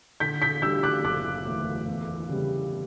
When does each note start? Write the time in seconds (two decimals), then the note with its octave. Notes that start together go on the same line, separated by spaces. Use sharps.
0.20 D3 G6 B6
0.42 G6 B6
0.62 G3 D4 E6 G6
0.83 D6 F#6
1.04 F#1 D6 F#6
1.46 E2 D3 A3
1.88 E2
2.29 C#3 G3 B3